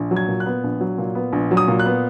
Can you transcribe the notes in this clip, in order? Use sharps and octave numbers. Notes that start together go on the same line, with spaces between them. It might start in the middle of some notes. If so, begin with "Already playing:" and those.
Already playing: A#1
F#3
G#6
A#2
F#6
B3
A#1
F#3
A#2
B3
A#1
F#3
D#6
A#2
F#6
B3